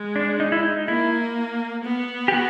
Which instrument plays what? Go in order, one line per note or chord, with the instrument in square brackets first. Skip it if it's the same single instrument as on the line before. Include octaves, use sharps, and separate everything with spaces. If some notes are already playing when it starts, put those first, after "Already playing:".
Already playing: [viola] G#3
[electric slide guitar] D4
D#4
E4
D#4
[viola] A#3 [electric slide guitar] E4
[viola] B3
[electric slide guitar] G4
F#4